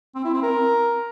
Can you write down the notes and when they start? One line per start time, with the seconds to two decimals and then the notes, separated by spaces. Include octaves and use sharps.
0.15 C4
0.25 E4
0.34 C4
0.43 A#4